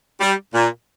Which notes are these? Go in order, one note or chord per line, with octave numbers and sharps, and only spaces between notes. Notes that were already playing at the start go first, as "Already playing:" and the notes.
G3
A#2